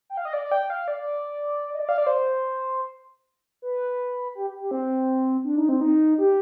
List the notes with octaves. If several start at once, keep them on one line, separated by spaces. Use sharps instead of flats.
G5
F5
D#5
D5
G5
F5
D5
D#5
D5
F5
D5
C5
B4
G4
G4
C4
D4
D#4
C4
D#4
G4